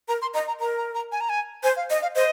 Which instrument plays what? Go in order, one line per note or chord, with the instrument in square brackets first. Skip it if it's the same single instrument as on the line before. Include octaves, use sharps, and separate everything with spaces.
[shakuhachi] A#4 [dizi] A#5
[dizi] C6
[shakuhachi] D#5 [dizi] A#5
[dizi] A#5
[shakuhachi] A#4 [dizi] A#5
[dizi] A#5
A#5
G#5
A#5
G#5
[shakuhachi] C5 [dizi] G#5
[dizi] F5
[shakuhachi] D#5
[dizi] F5
[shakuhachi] C5 [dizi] D#5